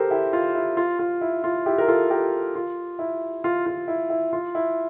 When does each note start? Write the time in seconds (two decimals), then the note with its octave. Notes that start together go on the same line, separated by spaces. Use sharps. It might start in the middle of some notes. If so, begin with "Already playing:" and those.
Already playing: G4 A4 A#4 C5
0.11 E4 G4
0.33 F4
0.55 E4
0.77 F4
0.99 F4
1.21 E4
1.44 F4
1.66 E4 G4
1.78 A#4
1.88 F4 A4
2.10 G4 A#4
2.55 F4
2.99 E4
3.44 F4
3.66 F4
3.88 E4
4.10 E4
4.33 F4
4.55 E4